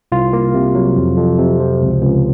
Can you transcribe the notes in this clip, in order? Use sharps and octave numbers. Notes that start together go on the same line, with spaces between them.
C2 F4
A#3
C3
F#3
F2
F2
C3
F3
C#2
C#2